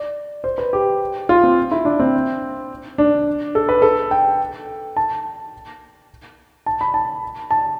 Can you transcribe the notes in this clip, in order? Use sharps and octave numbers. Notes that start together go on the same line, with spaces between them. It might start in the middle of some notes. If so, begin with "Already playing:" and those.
Already playing: D5
C5
B4
G4
F4
C4
E4
D4
C4
D4
A4
B4
A4
G5
A5
A5
B5
A5
A5